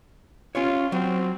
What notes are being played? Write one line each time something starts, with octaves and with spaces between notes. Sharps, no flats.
C#4 F4 G4 C#5
F#3 C4